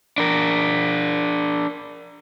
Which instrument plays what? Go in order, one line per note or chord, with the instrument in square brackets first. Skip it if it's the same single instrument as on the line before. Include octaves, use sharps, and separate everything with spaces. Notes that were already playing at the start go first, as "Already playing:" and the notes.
[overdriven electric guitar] D4 A#4